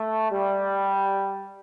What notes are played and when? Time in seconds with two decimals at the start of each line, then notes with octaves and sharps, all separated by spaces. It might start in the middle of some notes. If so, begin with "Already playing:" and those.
Already playing: A3
0.31 G3